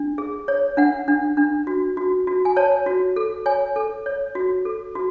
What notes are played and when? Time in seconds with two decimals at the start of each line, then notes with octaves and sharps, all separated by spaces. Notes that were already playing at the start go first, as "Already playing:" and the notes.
Already playing: D4
0.18 G#4
0.48 C#5
0.77 D4 F#5
1.08 D4
1.37 D4
1.67 F#4
1.97 F#4
2.27 F#4
2.45 G#5
2.56 C#5 A5
2.86 F#4
3.16 A4
3.46 C#5 G#5
3.76 A4
4.06 C#5
4.35 F#4
4.65 A4
4.95 F#4